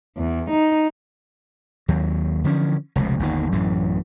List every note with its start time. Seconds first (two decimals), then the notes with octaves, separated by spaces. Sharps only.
0.17 E2
0.50 D#4
1.88 D#2 F#3
2.44 D3 E3 F3 C#4
2.96 F1 C#2 B2
3.19 G1 D#2 D#3
3.52 A1 F#2 E3